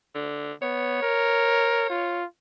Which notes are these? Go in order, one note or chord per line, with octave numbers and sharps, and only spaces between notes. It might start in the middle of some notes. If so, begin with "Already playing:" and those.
D3
B3 C#5
A#4
F4